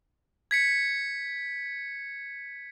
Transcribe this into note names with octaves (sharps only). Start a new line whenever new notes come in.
G#6 B6 C#7